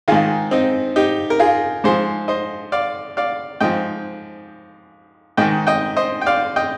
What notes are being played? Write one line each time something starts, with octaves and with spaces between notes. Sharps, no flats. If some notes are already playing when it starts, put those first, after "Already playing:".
G#2 D#3 F4 G#4
C4 D#4
D#4 G4
A#4
F4 G#4
G#2 F3 G#4 C5
C5 D#5
D5 F5
D5 F5
G#2 F3 D#5 G5
G#2 D#3 D#5 G5
D#5 G5
C5 D#5
G5
D5 F5
D#5 G5